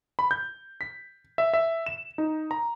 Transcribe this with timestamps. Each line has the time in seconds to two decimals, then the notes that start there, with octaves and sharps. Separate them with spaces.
0.19 B5
0.31 G6
0.81 B6
1.38 E5
1.54 E5
1.86 E7
2.18 D#4
2.51 A#5